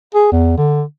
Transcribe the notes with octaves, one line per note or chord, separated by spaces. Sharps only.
G#4
E2
D3